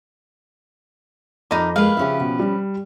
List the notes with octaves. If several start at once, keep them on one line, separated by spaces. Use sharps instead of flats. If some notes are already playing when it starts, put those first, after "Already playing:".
F2 D#4 A#4 D#5 B5 D6
G#3 A#3 B4 F5
C#3 F3 C#4 G4 E5
B2
G3